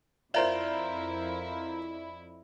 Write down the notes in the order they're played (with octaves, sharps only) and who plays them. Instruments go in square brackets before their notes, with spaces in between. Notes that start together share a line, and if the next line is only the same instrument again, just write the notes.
[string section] F2 E4 [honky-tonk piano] F4 A#4 C5 [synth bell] D5 E5